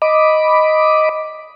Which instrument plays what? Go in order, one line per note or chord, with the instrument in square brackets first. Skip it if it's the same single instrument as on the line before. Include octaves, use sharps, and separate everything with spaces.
[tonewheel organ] D#5 B5 D6